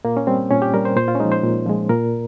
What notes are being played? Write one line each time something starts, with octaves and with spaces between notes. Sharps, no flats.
A#2 A#3
C#4
G3 C4
A#2 C#4
G4
G3 A#4
C5
A#2 C5
F4
C#4
F3 G#3 D#4
C5
A#2
F3 G#3
A#2 A#4